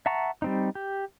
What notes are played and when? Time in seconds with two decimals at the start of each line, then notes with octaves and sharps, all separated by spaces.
0.06 E5 F#5 A5 A#5 C#6
0.42 G3 C4 D#4
0.75 G4